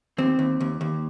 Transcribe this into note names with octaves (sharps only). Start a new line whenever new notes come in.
D#2 C4
D#2
D#2
D#2